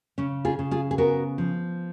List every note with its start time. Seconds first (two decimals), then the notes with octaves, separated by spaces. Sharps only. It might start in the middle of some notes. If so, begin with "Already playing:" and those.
0.18 C#3 C#4
0.45 F4 G#4
0.59 C#3
0.71 F4 G#4
0.91 G#4
0.98 B3 F#4 A#4
1.38 F3